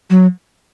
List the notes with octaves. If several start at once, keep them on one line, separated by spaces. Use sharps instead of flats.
F#3